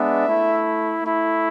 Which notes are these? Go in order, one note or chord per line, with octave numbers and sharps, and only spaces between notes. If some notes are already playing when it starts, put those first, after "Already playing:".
Already playing: G#3 B3 D4 E5
A3 E4
A3 E4